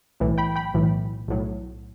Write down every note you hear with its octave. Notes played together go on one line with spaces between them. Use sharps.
B1 A2 E3
G5 B5
G5 B5
B1 A2 E3
B1 A2 F#3